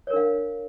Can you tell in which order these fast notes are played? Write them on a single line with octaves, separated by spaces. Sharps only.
C#5 A#4 D4 F5